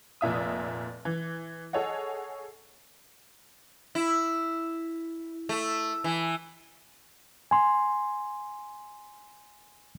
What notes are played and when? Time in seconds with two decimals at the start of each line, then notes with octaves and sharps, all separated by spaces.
0.21 F1 A#2 E5 D#6
1.05 E3
1.73 G#4 A4 C#5 D#5 F#5
3.95 E4
5.49 A3
6.04 E3
7.51 G#5 C6